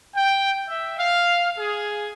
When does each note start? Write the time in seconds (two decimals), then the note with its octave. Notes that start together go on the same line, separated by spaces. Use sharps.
0.15 G5
0.68 E5
0.98 F5
1.58 G#4